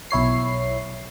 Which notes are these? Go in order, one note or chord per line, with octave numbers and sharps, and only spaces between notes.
B1 E4 C#5 C7